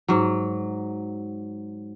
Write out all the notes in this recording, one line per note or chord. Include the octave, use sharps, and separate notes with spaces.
G#2 F#3